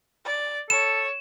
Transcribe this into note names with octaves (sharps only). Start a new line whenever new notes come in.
D5
A4 C#5 E7